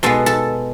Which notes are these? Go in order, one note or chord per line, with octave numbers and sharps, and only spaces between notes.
B2 G#3 B3 A4
A4